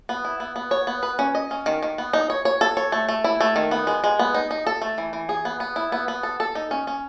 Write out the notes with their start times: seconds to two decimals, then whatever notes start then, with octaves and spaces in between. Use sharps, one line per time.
0.09 B3
0.25 E4
0.40 B3
0.56 B3
0.71 C#5
0.87 B3
1.03 B4
1.19 C#4
1.35 D#5
1.51 C#4
1.66 D#3
1.83 D#3
1.98 B3
2.13 D#4
2.30 C#5
2.45 C#5
2.61 A4
2.77 C#5
2.92 A3
3.09 A3
3.24 E4
3.41 A3
3.56 D#3
3.71 B3
3.87 G#3
4.04 G#3
4.19 B3
4.34 D#4
4.51 D#4
4.67 A4
4.82 A3
4.98 E3
5.13 E3
5.29 G#4
5.45 B3
5.60 B3
5.76 E4
5.92 B3
6.08 B3
6.23 A4
6.40 A4
6.55 D#4
6.71 C#4
6.87 C#4